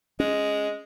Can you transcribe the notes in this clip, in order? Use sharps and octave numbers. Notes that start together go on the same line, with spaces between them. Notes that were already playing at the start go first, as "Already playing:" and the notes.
G#3 C#4